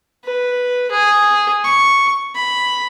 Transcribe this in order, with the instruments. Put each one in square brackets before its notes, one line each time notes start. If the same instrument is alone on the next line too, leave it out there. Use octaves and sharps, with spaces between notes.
[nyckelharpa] B4
G#4
C#6
B5